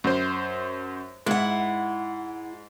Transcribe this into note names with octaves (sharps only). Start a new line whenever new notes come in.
F#2 C5
G#2 E4 F#5